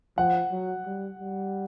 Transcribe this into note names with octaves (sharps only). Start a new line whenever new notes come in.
F3 F#5
F#3
G3
G3